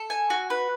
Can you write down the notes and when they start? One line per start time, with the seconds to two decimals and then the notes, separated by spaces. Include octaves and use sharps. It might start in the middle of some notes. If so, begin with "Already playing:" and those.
Already playing: A4
0.10 G#5
0.30 F#4
0.50 B4